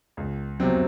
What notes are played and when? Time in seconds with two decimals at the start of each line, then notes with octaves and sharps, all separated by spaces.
0.17 C#2
0.60 C3 F#3 C4